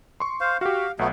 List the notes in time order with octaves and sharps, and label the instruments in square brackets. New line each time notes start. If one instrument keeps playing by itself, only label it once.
[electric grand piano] C6 C#6
[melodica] C5 F5
[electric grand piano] F#4 G4 [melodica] F5
[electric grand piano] B1 [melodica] F#3 A3 B3